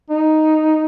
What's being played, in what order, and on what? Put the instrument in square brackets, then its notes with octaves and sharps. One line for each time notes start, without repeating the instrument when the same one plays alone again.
[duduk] D#4